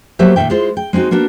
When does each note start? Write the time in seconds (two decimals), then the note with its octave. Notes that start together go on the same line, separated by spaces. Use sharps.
0.19 F#3 A#3 B3 G4 C5 E5
0.36 A#2 D#3 E3 E5 G5
0.50 G#3 E4 F4 C5
0.77 G5
0.93 G#3 C4 C#4 D#4 F#4
1.11 A#3 B3 D4 F#4